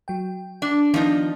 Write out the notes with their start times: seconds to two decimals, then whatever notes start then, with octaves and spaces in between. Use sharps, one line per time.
0.08 F#3 G5
0.62 D4
0.94 D#3 F3 B3 D4 D#4